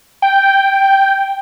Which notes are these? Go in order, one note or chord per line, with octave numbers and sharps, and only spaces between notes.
G5